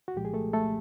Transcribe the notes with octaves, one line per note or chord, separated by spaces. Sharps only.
F#4
C2 A#2 F3 G#3 G4
G#4
A3 A4
A3 A4